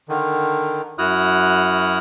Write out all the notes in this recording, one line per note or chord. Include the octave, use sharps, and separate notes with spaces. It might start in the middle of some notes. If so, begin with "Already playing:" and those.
D3 D#3
F#2 E4 F#4 D#6 F6 F#6